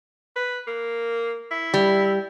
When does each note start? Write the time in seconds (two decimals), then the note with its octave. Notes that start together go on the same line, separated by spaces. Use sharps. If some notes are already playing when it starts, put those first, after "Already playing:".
0.36 B4
0.67 A#3
1.51 E4
1.74 G3